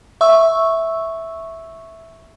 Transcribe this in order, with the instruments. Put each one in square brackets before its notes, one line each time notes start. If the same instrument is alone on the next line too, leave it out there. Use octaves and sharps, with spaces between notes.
[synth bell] E5 C#6 E6